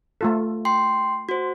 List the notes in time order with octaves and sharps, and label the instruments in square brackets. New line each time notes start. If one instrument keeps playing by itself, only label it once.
[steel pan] A3 F4 A4
[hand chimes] G5 C6 C7
F#4 C5